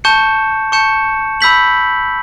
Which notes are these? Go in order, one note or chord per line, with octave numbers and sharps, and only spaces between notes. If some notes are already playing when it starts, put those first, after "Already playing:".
A5 C#6 G6 C#7 E7
A5 C#6 G6 C#7 E7
B5 E6 G6 B6 F#7